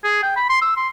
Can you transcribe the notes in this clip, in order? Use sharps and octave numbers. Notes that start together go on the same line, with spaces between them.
G#4
G5
B5
C6
E6
C6